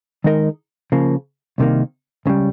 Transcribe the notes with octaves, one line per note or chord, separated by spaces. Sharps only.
D#3 G#3 D#4 A#4 D#5
C#3 F3 A#3
C2 C3 D#3 A#3
C#2 C#3 G3